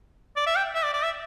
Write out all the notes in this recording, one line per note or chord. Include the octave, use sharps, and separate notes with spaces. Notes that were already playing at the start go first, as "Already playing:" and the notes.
D5
E5
G5
E5
D5
D5
E5